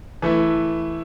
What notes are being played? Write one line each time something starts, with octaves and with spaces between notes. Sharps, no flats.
E3 A3 E4